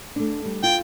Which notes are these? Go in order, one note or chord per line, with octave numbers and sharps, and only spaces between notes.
A3 D4
G3
F4 G5